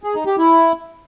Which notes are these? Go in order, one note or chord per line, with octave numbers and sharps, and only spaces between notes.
G#4
D#4
G4
E4